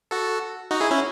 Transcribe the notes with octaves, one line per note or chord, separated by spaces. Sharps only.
F#4 A4
D#4 F#4
E4 G#4
C#4 E4